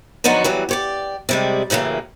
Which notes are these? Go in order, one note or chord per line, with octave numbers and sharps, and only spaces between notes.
D3 F3 F#3 B3 D#4 F#4
E3 F#3 G3
G4 C#5 D5
C3 G3 G#3
F#2 A2 C#3 E3 A#3